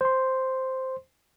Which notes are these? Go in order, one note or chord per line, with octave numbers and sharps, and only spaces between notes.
C5 C6